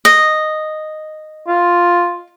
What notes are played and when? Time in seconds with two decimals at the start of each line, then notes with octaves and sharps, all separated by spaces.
0.05 D#5
1.48 F4